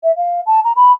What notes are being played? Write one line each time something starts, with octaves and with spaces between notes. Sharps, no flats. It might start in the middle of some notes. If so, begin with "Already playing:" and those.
E5
F5
A5
A#5
B5